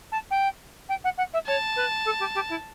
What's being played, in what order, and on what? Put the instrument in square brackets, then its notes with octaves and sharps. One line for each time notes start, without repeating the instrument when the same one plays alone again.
[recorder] A5
G5
G5
F#5
F#5
E5
[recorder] C#5 [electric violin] A5
[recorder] B4
A4
G4
G4
E4